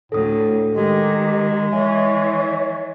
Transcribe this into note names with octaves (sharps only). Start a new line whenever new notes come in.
D2 A2 A4 D#6
D#3 G#3 G4
E3 C#5 D#5 E5 G#5